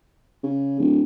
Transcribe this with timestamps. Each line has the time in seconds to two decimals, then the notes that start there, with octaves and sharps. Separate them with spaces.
0.43 C#3
0.79 D1